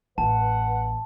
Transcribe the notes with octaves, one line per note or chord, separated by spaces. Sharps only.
A1 B4 F#5 A5